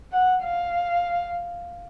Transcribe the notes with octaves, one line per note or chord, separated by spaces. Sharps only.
F#5
F5